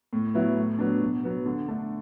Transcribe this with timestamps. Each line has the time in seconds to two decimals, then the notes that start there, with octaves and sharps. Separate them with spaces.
0.13 A2
0.34 F#3 B3 E4
0.57 A2
0.79 F#3 B3 D4
1.01 B2
1.24 F#3 B3
1.46 D3
1.68 A3 D4